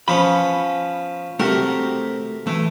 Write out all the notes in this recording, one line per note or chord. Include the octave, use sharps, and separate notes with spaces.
F3 B3 C#4 B5
C3 A3 F#4 G4 A#4
E3 A3